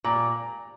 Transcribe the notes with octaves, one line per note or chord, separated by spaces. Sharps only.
A#2 A#5